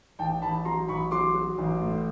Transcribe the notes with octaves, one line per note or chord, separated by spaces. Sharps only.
A1 G5 A5
A1 A5 B5
F#3 A#5 C6
A1 B5 C#6
F#3 C6 D6
F#3
A1
A2